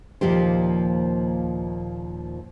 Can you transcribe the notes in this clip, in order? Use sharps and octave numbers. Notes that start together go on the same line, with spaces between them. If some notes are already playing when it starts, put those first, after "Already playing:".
D#2 A#2 F3 G4 C5